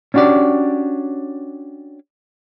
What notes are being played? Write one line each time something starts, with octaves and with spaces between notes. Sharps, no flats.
C#4 D4 F#4 G4 D5